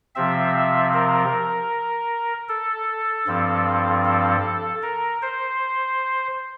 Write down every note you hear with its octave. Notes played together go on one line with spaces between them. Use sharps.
C3 F3 C4 E5
A#4
A4
G2 F3 C4
A4
A#4
C5